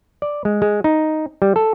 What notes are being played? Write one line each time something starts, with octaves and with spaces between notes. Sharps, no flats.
D5
G#3
G#3
D#4
G3
A4